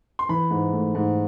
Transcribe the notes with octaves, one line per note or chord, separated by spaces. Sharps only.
C6
E3 B5
G#2
A3
G#2